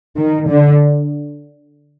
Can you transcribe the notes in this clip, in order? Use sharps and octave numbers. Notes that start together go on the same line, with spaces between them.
D#3
D3